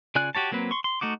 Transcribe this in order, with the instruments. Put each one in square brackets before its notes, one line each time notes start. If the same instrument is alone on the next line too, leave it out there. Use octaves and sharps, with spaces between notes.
[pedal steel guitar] C#3 F4 D5 G#5 F#6
F#4 G4 C#5 A5
F#3 A#3 C4 B4
C6 C#6
C6
A3 D#4 F#4 D6